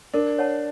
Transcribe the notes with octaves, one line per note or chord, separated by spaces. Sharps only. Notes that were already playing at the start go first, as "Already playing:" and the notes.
D4 A#4
C#5 F#5 A5